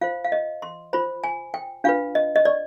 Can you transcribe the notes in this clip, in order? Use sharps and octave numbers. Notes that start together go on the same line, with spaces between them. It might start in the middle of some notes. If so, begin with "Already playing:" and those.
F4 C5 F5
F5
D#5
C6
F4 C5 B5
G#5
G5
D4 F4 B4 F5
D#5
D#5
D5